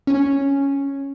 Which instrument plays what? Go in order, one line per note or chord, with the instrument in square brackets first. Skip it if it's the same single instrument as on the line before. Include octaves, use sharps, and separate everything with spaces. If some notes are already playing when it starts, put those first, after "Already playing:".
[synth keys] C#4